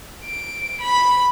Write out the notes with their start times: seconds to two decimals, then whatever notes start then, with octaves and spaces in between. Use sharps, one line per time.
0.25 D7
0.82 B5